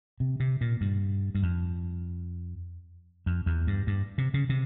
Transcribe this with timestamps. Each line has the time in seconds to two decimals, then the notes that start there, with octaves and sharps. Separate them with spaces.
0.20 C3
0.40 C3
0.61 A#2
0.81 G2
1.35 G2
1.43 F2
3.26 F2
3.46 E2
3.67 G2
3.87 G2
4.18 C3
4.34 C#3
4.49 C3